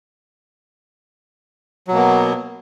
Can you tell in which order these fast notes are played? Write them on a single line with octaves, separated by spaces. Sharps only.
F#3 B2 A#3 B3